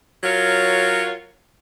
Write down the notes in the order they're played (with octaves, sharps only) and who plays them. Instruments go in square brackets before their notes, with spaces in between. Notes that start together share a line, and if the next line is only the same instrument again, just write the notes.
[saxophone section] F#3 F4 A#4 C#5